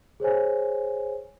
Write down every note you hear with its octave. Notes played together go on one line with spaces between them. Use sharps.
G#4 C5 C#5 G#5